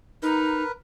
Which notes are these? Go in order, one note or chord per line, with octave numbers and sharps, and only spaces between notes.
D#4 A#4 B4